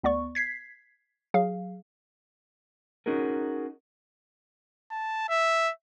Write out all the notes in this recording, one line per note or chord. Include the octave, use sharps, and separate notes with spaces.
D2 B3 D5 C#6
G#6 B6 C7
F#3 G#4 F5
C#4 D#4 F#4 G#4 A#4
A5
E5